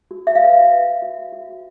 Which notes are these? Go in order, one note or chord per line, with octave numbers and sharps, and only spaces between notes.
F#4
E5
F5
B4 E5
B4
F#4
F#4